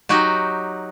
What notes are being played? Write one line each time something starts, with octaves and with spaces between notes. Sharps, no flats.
F#3 D#4 F#4 G4